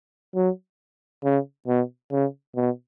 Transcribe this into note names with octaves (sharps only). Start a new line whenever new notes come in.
F#3
C#3
B2
C#3
B2